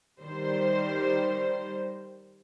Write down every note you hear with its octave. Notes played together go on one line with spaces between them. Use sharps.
D#3 G3 C5